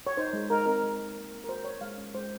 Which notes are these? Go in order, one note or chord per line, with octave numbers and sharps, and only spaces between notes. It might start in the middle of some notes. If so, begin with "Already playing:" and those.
C#5
D#4 C5
G#3
D#4 A#4
C4 A#4
G#3
G#3
A#3
A#3
A#4
F#4 C5
F#4 C#5
G#3 F5
C#4
G#3 C5